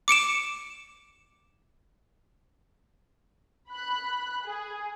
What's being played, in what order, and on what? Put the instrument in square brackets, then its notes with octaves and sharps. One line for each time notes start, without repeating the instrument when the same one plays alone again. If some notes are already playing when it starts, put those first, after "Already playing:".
[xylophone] D6 C#7 D7 E7
[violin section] B5 F#6
G#4